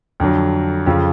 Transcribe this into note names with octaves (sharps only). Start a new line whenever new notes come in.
F2 D3 F#3
F2 C#3 F3